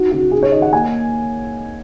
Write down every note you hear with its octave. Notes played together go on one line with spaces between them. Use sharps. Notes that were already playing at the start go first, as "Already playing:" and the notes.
Already playing: D#4 F#4
C#3 F#4
D#4 G#4
C#5
D#3 D#5
F#5
A#3 G#5